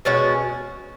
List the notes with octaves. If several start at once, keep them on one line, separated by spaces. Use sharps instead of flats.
B2 G#3 C#4 F#4